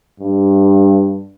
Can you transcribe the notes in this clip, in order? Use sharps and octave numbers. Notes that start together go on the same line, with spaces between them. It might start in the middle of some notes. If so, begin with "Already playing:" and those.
G2